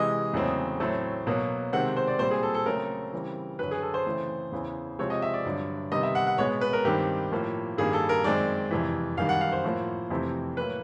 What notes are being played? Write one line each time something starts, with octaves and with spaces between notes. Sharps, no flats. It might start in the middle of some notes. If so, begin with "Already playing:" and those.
Already playing: C3 E3 G#3 D#5
E2 C#3 F#3 A3 C4
A2 F#3 A3 C4
B2 F#3 A#3
C3 D#3 G#3 C4 F#5
C5
D5
A#2 G3 C4 C5
G#4
A4
A4
C#3 F#3 A3 C4 A#4
C#3 E3 G3 C4
F#2 D3 F#3 B4
G#4
A4
C5
C#3 E3 A3 C4
E2 C#3 E3
C3 F3 G#3 C4 C#5
D#5
E5
D5
G2 D3 F#3
C3 D#3 G3 B3 D#5
E5
F#5
F#5
B2 G#3 B3 C#5
B4
A#4
G2 D#3 G3 C4 G4
A2 F3 A#3
G2 D#3 G3 A#3 G#4
A4
A#4
F#2 D#3 G#3 C4 D5
F2 C3 E3
F#2 D#3 G3 F5
F#5
F5
C5
A2 F3 A#3
F2 C3 E3 A3 C4
A2 F#3 A#3 B4